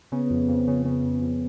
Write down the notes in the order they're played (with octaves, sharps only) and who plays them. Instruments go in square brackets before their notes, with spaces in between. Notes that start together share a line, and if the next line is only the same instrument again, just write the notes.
[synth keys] C#3 [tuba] B3
[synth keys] F2
F2
C#3
[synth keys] C#3 [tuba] B3
[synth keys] F2
F2